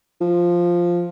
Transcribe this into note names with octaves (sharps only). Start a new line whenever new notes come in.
F3